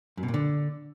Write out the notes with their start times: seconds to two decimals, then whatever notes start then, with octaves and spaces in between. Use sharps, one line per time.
0.17 F#2
0.23 B2
0.28 A#2
0.34 D3